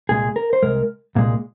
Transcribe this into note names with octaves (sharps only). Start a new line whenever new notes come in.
C2 A#2 G#3 G#4
A#4
C5
C2 A#2 G#3 A#4
C2 A#2 G#3